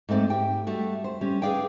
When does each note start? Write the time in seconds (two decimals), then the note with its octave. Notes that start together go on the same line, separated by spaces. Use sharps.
0.09 G#2 G#3 A3 C4 D5
0.30 G4 G5
0.67 G3 A3 F#4
1.04 C5
1.21 G3 C#4
1.42 G#4 A4 B4 D5 F5 G5